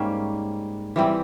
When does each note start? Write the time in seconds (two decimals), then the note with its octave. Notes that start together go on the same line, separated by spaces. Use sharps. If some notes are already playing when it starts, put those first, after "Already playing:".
Already playing: G#2 G3 A#3 C#4 C5
0.96 E3 G3 C4